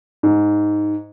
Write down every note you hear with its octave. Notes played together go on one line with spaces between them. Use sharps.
G#2